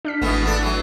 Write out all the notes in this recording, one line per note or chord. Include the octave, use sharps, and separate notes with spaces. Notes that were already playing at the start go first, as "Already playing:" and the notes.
D4 F6 B6
G#1 B2 E3 A3 B3 D#6
D4 E4 A4
E3 F#3